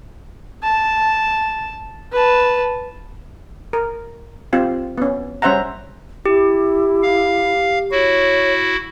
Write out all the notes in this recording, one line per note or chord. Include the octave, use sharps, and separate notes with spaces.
A5
B4 A5
A#4
C4 F4 G4
B3 C#4
G3 C#4 C5 E5 F#5 A#5
E4 G4
F5
E4 F#4 C#5